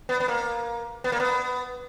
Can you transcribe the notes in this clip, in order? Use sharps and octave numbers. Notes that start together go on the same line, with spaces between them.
B3
B3
A#3
B3
A#3
B3